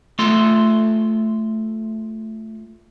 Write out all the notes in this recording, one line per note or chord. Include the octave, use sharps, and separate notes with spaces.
A3 F4 A4 C6